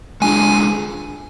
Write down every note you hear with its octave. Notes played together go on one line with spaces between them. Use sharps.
G#3 D4 F4 G#4 G#5